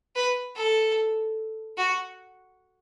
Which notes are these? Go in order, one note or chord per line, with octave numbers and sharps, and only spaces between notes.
B4
A4
F#4